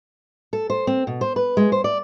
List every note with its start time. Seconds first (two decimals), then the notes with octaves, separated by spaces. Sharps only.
0.53 A4
0.70 C5
0.87 C4
1.07 B2
1.21 C5
1.36 B4
1.57 G#3
1.72 C5
1.84 D5